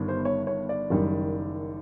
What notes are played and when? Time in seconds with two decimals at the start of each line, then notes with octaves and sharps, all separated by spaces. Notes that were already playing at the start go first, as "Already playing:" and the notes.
Already playing: G1 G2 D#3 G3 B3
0.08 C5
0.25 C#5
0.47 C#5
0.69 D5
0.90 F#1 F#2 D#3 G3